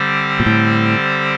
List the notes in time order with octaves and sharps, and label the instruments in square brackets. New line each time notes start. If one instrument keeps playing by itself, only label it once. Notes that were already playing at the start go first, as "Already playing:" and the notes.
Already playing: [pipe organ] D3 G3 C4 G4 C5
[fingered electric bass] A#2
A2